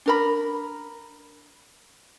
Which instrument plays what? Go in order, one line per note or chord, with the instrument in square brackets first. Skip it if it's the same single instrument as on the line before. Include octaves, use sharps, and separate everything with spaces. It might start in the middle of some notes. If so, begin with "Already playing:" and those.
[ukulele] D4 A#4 B5